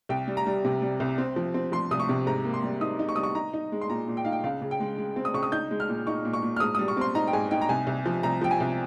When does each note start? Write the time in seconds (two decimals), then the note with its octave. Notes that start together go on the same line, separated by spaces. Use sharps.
0.09 C2 G5
0.28 G3
0.37 A#5
0.47 G3
0.65 C3
0.82 G3
1.00 C2
1.18 C4
1.36 F3
1.54 C4
1.72 F3 C6
1.91 C2 D#6
2.00 C#6
2.09 C3
2.26 G#2 A#5
2.45 A#3
2.54 C6
2.64 G3
2.81 D#4 D#6
2.99 D#4
3.09 C#6
3.16 G3 D#6
3.23 C#6
3.35 D#4 A#5
3.53 D#4
3.72 G#3
3.81 C6
3.90 A#2 A#5
4.08 A#2
4.17 G5
4.25 D#4 F5
4.32 G5
4.44 C#2 F5
4.62 C#3
4.71 G5
4.80 G#3
4.98 G#3
5.16 C4
5.25 D#6
5.34 C#2 C#6
5.43 D#6
5.52 D#4 G6
5.71 G#3
5.80 F6
5.88 A#2
6.07 D#4 C#6
6.25 A#2
6.33 C#6
6.43 A#2
6.56 F6
6.60 G#2 D#6
6.75 D#6
6.79 G3
6.88 C#6
6.97 C4 C6
7.15 D#4 A#5
7.27 G5
7.33 G#2 G#5
7.51 D#4 G5
7.61 A#5
7.69 C2 G#5
7.87 C2
8.06 F3
8.23 C2 A#5
8.41 F3 G5
8.51 G#5
8.60 C2